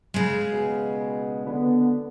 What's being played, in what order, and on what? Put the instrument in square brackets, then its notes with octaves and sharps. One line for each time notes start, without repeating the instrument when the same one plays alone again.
[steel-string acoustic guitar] C#3 G#3
[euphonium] B2
[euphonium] D3 [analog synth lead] B3